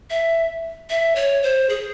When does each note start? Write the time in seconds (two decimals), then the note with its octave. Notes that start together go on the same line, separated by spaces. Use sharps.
0.10 E5
0.90 E5
1.16 C#5
1.43 C5
1.69 G#4